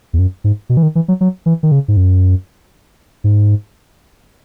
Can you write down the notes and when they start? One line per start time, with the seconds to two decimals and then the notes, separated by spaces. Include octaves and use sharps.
0.13 E2
0.19 F#2
0.44 G#2
0.69 B2
0.77 E3
0.83 D#3
0.95 E3
1.08 F#3
1.21 F#3
1.46 E3
1.63 D#3
1.72 C#3
1.88 G#2
1.97 F#2
3.24 G#2